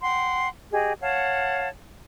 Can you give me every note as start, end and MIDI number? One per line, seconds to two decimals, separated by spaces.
0.02 0.49 78
0.02 0.49 79
0.02 0.49 84
0.71 0.93 67
0.71 0.93 68
0.71 0.93 75
1.01 1.68 73
1.01 1.68 77
1.01 1.68 78
1.01 1.68 81